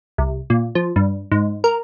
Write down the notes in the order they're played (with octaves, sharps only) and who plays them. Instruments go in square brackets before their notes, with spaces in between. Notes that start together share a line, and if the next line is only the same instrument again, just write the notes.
[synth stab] C2
A#2
F3
G2
G#2
A#4